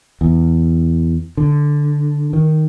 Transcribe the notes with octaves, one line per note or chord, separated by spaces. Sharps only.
E2
D3
D#3